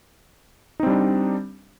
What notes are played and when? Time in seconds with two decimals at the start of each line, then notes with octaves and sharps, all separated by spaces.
0.80 D#4
0.83 C4
0.87 G3
0.90 D4